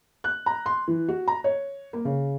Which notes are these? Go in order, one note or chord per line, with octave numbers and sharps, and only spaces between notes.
F#6
A#5
C6
E3
F#4
A#5
C#5
A#3
C#3